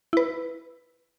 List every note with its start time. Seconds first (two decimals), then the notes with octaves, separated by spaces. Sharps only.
0.13 E4 B4